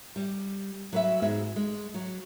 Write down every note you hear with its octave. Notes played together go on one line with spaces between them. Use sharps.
G3
F#3 B4 E5
G#2 B3 F#4 G#4 E5
G#3
F#3